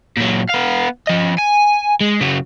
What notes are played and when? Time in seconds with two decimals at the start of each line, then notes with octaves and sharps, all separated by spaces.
0.17 A#2 F#3
0.50 B3 F5
1.07 F3 D#5
1.38 G#5
2.01 G#3
2.21 C#3 F#3